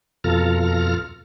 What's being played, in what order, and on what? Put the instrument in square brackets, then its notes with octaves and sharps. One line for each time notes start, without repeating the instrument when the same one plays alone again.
[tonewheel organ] F2 B2 F4 A4 A#5 F6